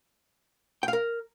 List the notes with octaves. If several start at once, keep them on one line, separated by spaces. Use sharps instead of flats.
G5
F5
A#4